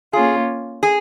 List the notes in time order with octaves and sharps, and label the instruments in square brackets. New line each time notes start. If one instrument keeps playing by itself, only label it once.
[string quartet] A#3 C#4 F4 [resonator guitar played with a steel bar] G#4
[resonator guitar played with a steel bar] G#4